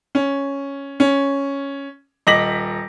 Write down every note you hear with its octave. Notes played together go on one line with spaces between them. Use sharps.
C#4
C#4
D#1 D#5 D6 A#6 B6 F#7